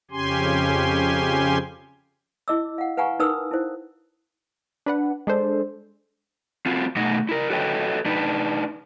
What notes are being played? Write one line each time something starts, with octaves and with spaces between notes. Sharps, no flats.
F2 C#3 C#4 G4 G#5 C6
E4 D#5 D6 E6
F5 F#5
B4 F5 F#5 G#5 A#5 C#6
D#4 A#4 B4 D#6 E6
E4 C5
D4 B4 F#5
G#3 D4 A4 C5
C4 F4 F#4
B2 A3 D#4 D#5 F#5
E4 A#4
F#4 A4 B4 C#5 D#5 G5
D4 D#4 B4